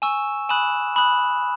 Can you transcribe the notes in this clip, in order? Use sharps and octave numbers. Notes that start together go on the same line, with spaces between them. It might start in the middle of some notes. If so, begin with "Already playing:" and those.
G#5 C#6 E6 E7
G#5 B5 D#6 F#6 E7
B5 D#6 F#6